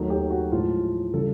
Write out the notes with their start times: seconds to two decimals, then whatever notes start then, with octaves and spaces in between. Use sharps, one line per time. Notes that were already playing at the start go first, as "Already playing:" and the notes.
Already playing: D#2 D#3 F#3 A3
0.10 G4
0.30 F#4
0.51 A2 F3 G#3 F4
1.13 C#3 E3 G3 A4